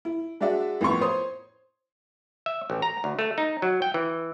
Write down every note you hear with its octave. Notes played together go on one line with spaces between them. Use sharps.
E4
G#3 D4 F#4 D5 E5
A1 F2 B3 C#6
C5 C#5 C6 D#6
E5
A1
A#5
D2
A3
D#4
F#3
G5
E3